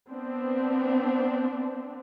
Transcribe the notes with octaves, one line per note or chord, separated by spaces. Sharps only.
B3 C4 D4